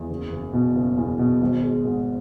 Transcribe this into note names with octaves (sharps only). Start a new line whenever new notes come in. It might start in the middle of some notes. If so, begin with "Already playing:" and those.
Already playing: E2
F#1
F#1
B2
F#1
E2
B2
G#1
G#3
G#2